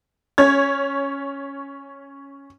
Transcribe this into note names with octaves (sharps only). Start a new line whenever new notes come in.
C#4 C#5 G#6